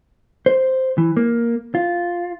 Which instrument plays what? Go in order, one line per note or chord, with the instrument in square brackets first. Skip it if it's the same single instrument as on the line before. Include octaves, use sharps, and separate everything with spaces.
[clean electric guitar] C5
E3
A#3
F4